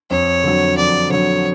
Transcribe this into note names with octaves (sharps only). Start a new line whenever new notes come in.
F2 C#5
D3 F#3
F2 D5
D3 F#3 C#5